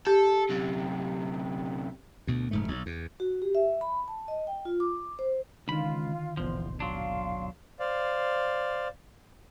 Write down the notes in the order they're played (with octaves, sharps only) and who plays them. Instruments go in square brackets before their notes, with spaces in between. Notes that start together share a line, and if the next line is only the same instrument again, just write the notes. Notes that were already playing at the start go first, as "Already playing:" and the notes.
[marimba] G4 [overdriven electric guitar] A4
[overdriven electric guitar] F#2 C3
[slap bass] D2 B2
F1 G#2 A3
B1
E2
[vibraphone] F#4
G4
E5
B5
A5
D#5
G5
F4
D6
C5
[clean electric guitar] C#2 B5 [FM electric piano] D3 D#3 [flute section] F4
[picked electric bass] D#1 G#1 B2 [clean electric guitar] E2 F3 [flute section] C5
[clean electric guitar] F#3 D4 [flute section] F5 C6
[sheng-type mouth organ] C5 D5 F5